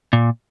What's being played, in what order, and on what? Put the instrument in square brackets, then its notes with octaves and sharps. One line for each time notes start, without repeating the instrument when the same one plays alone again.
[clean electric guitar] A#2